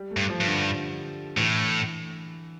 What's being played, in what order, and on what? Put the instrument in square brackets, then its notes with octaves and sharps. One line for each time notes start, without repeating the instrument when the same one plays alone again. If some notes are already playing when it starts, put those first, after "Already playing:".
Already playing: [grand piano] G3
A3
[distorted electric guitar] G2
[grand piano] F3
[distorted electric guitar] G2
[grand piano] D3
D3
[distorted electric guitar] A2 [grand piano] E3